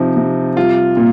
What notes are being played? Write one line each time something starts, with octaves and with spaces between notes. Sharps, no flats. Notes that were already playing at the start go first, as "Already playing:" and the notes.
Already playing: C3 F3 D#4
C3
G3 F4
A#2